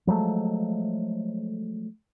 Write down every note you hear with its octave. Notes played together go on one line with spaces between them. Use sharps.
F3 F#3 G#3 A3